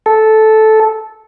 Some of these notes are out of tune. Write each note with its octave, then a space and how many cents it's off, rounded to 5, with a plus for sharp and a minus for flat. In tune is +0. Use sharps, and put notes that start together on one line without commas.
A4 -10